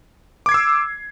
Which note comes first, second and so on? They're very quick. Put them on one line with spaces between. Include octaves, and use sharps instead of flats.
D6 G#6 C7 E6